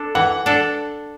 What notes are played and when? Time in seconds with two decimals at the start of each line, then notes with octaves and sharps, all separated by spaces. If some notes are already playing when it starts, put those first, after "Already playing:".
Already playing: D4 A4
0.15 E3 F#5
0.46 D4 A4